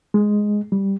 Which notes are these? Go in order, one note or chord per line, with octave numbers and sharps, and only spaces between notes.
G#3
G3